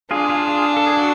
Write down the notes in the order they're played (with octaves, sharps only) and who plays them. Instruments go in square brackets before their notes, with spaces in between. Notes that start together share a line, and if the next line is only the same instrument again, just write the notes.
[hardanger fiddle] D4 [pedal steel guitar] F4 G#4
[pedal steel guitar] F4 G#4
F4 G#4
A4
G#4
F#4 A4